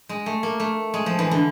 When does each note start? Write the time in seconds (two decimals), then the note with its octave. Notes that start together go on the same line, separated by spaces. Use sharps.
0.09 G#3
0.26 A3
0.43 A#3
0.60 A3
0.94 G#3
1.06 F3
1.19 E3
1.31 D3